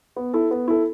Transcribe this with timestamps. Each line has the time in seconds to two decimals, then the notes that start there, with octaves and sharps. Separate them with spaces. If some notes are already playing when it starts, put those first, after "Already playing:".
0.16 B3
0.33 E4 A4
0.51 B3
0.68 E4 A4